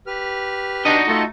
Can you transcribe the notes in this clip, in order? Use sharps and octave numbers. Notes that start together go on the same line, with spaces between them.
G4 B4 F6
D4 D#4 F#4 D#5
A3 F4 A5